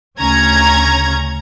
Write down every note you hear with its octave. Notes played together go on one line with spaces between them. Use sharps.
D2 C#3 C#4 A#5 G#6